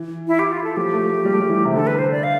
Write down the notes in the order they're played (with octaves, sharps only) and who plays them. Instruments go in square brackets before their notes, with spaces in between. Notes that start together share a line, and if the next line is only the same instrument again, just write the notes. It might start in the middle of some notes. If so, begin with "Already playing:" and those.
Already playing: [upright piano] E3
[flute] E4
G4
F4
A4
[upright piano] F3 [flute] G4
[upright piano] A3
A3
G3
A3
G3
E3
C3
[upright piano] D3 [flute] A4
[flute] B4
C5
D5
F5